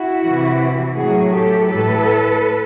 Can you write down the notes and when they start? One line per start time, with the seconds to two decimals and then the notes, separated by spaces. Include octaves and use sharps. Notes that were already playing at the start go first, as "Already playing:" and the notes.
Already playing: E4 F#4
0.24 C3 E3
0.96 A2 F#3 F#4 G#4
1.31 G4 A4
1.68 A2 E3 A4 B4